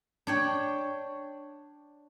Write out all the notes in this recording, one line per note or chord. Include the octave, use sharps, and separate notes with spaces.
D4 C#5 G5